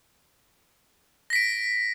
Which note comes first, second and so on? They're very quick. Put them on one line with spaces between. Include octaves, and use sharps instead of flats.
A#6 B6 D7